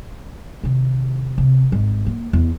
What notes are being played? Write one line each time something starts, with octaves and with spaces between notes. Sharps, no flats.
C3 D#3
C3
G#1
A#3
E2